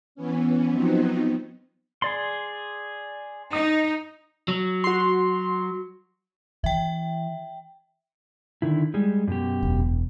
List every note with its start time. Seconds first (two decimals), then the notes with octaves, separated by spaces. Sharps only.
0.15 E3 B3 C#4
0.71 F3 F#3 B3 C4 D#4
2.02 G#4 D5 C6
3.53 D#4 D#6
4.48 F#3
4.84 F#4 C6
6.64 E3 E5 G5
8.62 D3 D#3 E4
8.94 G3 G#3
9.27 F#2 B2 G4
9.63 E1